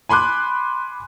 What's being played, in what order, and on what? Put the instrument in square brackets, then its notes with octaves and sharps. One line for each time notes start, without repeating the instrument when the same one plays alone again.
[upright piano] G#5 B5 C6 D6 F#6